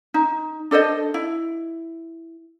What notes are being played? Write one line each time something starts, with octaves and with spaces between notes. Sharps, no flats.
D#4
D4 A4 C5 D#5
E4